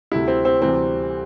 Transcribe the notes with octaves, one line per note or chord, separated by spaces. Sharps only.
D2 C3 G3 E4
C4
C4
D2 C3 E3 G3 C4